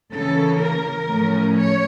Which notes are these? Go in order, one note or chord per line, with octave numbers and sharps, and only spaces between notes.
C#3 E3 A#3 C#4 A4
A#4
A2 F3 A3 C#4
C#5